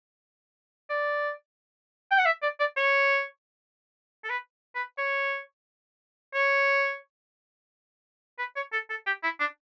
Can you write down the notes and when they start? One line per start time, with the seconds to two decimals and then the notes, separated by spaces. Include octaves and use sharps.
0.90 D5
2.11 G5
2.18 F#5
2.25 E5
2.42 D5
2.60 D5
2.77 C#5
4.24 A4
4.29 B4
4.75 B4
4.98 C#5
6.34 C#5
8.39 B4
8.56 C#5
8.73 A4
8.90 A4
9.06 G4
9.23 E4
9.40 D4